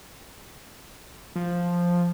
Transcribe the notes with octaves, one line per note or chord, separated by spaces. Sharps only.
F3